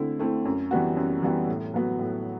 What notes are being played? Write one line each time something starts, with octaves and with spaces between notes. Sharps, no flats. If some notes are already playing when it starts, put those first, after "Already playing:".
Already playing: D3 A3 C4 E4
A3 C4 E4
F#2
E3 G3 B3 F#4
F#2
E3 G3 B3 F#4
A2
F#3 B3 F#4
A2